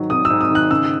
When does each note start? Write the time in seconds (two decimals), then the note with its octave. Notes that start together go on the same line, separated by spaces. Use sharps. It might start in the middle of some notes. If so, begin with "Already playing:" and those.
Already playing: G#2 D#3 F#3
0.10 G#1 D#6
0.25 E6
0.30 G#2
0.41 D#6
0.51 D#3 F#6
0.70 C#3 E6